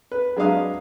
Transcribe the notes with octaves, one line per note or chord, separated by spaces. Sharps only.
B4
F#3 G#3 D4 B4 F5 D#6